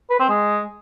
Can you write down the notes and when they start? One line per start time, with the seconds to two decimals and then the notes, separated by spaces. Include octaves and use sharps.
0.10 B4
0.20 C4
0.29 G#3